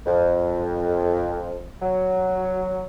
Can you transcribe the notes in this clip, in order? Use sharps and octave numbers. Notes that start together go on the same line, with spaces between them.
F2
F#3